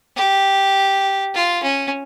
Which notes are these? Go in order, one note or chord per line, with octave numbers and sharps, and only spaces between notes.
G4
F4
C#4